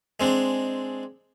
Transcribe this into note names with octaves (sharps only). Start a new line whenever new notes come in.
G#3 C4 D4